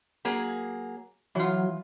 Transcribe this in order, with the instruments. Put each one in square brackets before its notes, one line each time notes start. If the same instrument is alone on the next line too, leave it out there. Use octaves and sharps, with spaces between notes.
[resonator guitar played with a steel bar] F#3 A#3 G#4
[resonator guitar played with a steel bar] E3 F4 [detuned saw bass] F#3